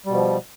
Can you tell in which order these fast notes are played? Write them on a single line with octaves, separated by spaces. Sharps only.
G3 B2 F3